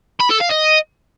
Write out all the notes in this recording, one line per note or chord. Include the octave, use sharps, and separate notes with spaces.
B5
A4
F5
D#5